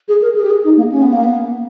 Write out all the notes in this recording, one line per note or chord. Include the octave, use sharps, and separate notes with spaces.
G#4
A#4
G#4
G4
G#4
D#4
A#3
C#4
B3
A#3
B3